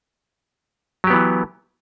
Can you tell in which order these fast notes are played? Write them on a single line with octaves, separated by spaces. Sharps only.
F#3 G4 B3 E3